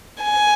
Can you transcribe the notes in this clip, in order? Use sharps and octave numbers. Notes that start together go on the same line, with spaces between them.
G#5